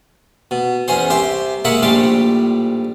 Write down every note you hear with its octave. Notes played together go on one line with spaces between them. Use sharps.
B2
E2 C#4 G#4 C5
C2 G4 C5 E5
G#3 A#3 C#5 E5 F#5
A#1 A2 G3 C6 D6